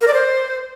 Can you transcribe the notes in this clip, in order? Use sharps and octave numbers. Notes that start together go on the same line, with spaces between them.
A#4
D5
C5